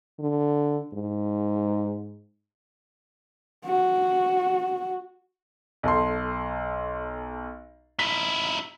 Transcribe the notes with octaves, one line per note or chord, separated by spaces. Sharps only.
D3
G#2
F#4
B1 A4 C6
D#4 E4 B6